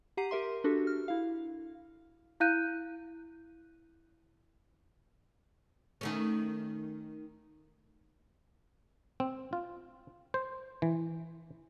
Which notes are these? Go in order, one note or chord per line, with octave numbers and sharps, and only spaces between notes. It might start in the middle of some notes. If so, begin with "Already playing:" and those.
G4 F#5 A#5 C7 D#7
G4 A#4 E5 C6
D4 F#4 G4 A4
F6
E4 F5
E4 F5 F#6 G6 D#7
D#3 A3 C#4
C4
F4
C5
E3